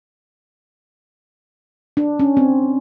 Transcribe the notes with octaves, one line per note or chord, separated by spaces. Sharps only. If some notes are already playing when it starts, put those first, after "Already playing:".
D4
C#4
C4